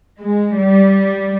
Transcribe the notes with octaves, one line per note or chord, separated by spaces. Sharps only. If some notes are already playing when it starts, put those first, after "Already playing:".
G#3
G3